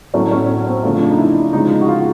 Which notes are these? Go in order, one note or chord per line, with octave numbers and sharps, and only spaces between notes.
A2 F#3 A3 C#4
C#4
C#4
C4
C#3 F3 A3 D4
D4
D#4
E4
C#3 F3 G#3 D#4
D#4
F#4
F4